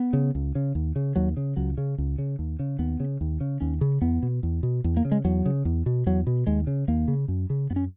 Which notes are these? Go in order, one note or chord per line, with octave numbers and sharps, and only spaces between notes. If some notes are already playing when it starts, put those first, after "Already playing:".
Already playing: B3
C#3
C#2
C#3
D#2
C#3
D#2 F#3
C#3
C#2 F#3
C#3
C#2
C#3
D#2
C#3
D#2 B3
C#3
D#2
C#3
D#2 C#4
C#3
E2 B3
B2
E2
B2
E2
A#3
C#3
G#3
E2 F#3
C#3
E2
B2
E2 F#3
B2
D#2 G#3
C#3
D#2 A#3
C#3
F#2
C#3
F#2 B3
C#4